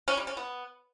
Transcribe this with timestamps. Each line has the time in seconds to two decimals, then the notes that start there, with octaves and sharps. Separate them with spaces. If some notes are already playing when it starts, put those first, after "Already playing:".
0.08 C#4
0.17 G3
0.27 C#4
0.37 B3